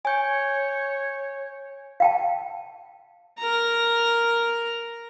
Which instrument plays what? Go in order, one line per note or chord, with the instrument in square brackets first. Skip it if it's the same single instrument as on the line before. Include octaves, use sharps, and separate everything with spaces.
[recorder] C#5 [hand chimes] G#5 G6
[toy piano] F5 G5 A5
[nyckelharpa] A#4 A#5